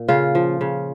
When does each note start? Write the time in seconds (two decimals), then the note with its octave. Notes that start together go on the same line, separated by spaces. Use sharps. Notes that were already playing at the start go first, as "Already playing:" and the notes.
Already playing: A#2
0.08 C#3 F4
0.35 F3
0.61 C#3